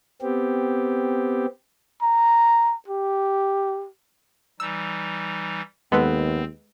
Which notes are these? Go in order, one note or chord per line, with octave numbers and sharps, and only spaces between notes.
B3 C4 G4
A#5
G4
E3 G3 D#4 E6
D#2 G#3 B3 C4 A4 B4